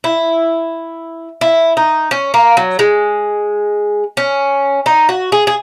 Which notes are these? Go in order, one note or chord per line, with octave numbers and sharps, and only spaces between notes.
E4
E4
D#4
C#4
A#3
F#3
G#3
C#4
D#4
F#4
G#4
G#4